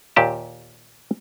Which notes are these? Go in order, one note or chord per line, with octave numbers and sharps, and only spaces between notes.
D#2 A#2 G4 A5